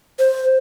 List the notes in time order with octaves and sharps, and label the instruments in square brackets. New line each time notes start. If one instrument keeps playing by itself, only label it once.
[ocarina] C5